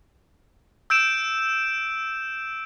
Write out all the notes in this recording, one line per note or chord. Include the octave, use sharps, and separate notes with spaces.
E6 G6 D7 E7